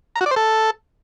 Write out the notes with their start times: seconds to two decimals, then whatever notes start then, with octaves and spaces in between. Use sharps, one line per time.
0.16 A#5
0.21 F#4
0.26 D5
0.31 C5
0.36 A4